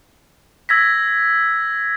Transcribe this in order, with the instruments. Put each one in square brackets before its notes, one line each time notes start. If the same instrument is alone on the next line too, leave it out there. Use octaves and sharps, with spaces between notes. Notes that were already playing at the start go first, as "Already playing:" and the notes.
[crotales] E6 G#6 A#6 B6